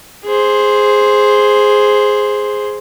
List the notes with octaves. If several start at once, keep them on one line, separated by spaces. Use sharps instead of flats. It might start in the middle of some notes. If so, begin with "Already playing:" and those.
G#4 C5